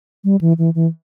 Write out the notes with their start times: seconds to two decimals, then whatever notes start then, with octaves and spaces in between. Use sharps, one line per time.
0.24 G3
0.41 E3
0.58 E3
0.75 E3